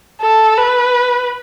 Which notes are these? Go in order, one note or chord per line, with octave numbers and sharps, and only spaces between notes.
A4
B4